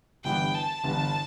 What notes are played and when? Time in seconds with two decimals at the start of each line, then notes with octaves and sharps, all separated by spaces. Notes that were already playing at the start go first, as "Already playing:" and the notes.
0.24 G1 G2 E3 B3 G5
0.54 A5
0.84 G1 G2 E3 B3